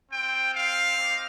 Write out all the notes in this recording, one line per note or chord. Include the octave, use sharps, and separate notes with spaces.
C4 F4 G5
F5
C4 D#4 G4